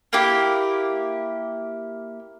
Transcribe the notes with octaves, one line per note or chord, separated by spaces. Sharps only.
A#3 E4 G4